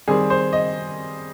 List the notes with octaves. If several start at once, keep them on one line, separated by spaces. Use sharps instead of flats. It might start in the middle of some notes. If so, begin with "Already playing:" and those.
D#3 G3 C4 G#4
C5
D#5